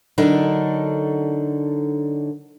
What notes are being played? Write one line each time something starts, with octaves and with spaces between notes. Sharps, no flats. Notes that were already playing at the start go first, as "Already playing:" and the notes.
D3 F#3 D4 D#4 A4 A#4